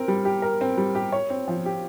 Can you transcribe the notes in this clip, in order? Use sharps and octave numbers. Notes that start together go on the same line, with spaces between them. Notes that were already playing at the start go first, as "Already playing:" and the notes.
Already playing: C4 A#4
G3
G4
A#4
C4
G3
G4
C#5
C4
F3
G4